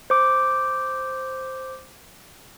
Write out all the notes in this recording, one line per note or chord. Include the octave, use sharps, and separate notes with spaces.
C5 D6